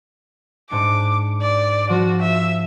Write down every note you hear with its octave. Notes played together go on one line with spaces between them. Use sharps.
G#2 D4 D6 C#7
D5
F3 F#4
E5